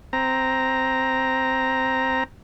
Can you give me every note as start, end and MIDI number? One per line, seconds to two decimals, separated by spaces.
0.13 2.24 60
0.13 2.24 82